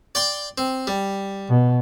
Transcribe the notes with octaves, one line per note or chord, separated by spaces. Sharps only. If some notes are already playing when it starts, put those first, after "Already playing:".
D5 G5 C6
C4
G3
B2